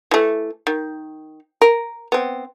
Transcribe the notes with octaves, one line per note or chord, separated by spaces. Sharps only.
E3 A3
D#3
A#4
B3 C4